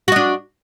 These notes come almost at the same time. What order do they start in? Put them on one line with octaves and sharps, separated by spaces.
F#4 D#5 D4